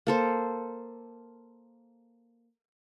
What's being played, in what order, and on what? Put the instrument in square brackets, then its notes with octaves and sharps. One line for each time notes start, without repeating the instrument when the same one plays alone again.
[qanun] A#3 A4 C5